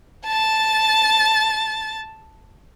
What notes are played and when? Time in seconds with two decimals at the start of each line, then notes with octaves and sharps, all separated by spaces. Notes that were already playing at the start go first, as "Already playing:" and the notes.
0.26 A5 A6